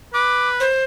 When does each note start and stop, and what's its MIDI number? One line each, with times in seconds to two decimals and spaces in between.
0.14 0.66 71
0.14 0.49 86
0.60 0.84 72